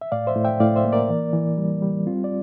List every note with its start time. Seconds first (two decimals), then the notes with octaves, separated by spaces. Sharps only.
0.01 E5
0.12 A2 D5 F5
0.27 C5 E5
0.35 A2
0.45 E5 G5
0.60 A2 D5 F5
0.76 C5 E5
0.85 A#3
0.92 A#4 D5
1.09 E3
1.33 E3
1.58 G3
1.82 G3
2.07 C4 F4
2.24 D5